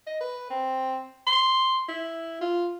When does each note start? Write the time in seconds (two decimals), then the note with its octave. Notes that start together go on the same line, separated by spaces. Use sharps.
0.07 D#5
0.21 B4
0.50 C4
1.27 C6
1.89 E4
2.41 F4